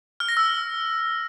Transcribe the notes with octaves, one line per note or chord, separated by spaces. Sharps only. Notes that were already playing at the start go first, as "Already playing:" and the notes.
F6
A#6
E6